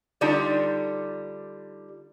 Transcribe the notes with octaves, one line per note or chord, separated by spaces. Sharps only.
D3 G3 D4 D#4 F4